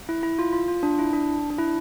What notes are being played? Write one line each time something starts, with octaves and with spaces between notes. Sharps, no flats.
E4
E4
F4
F4
F4
D4
E4
D4
D4
E4